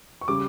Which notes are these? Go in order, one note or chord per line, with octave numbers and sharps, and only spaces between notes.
C#6
C#3 G3 D6